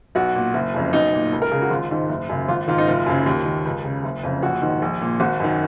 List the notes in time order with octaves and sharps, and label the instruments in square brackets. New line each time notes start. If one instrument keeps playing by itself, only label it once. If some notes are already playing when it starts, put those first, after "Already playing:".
[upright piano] B1 F#4
A#2
F#1
F2 C#3
B1 D#4
A#2
C#2
A#4
C#3 G#4
F#4
G#1 F4
G#2 D#3
F#1
F#2 C#3
G#1 F4
G#2 D#3 F4
D#4
F#1 F4
F#2 C#3
D#2
D#3
C#2
C#3
F#1
F2 C#3
A#1 F#4
G#2 D#3
A#1
A#2
G#1 F#4
F#2 D#3